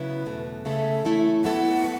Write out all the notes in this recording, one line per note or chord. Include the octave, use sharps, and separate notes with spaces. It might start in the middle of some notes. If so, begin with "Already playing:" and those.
Already playing: C#3 F#3 B3 E4 B4
E2 B2 A3
C#3 A3 C#4 A4 E5
E3 A3 E4 A4 C#5
F#3 B3 E4 A4 F#5
B4